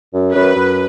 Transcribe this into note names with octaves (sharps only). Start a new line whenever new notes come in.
F#2
F#2 B4
F#2